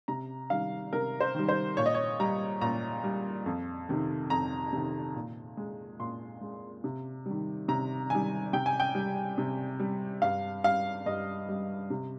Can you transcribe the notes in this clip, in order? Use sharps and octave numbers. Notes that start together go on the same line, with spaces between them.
C3 A#5
D#3 G3 F5
C3 A#4
C5
D#3 G3
C5
A#2 C#5
D#5
C#5
G3 A#5
A#2 A#5
G3
F2
C3 D#3
F2 A#5
C3 D#3
A#2
G#3
A#2 C6
G#3
C3
D#3 G3
C3 A#5
D#3 G3 G#5
C3 G5
G#5
G5
G3
C3
G3
G2 F5
G3 F5
G2 D#5
G3
C3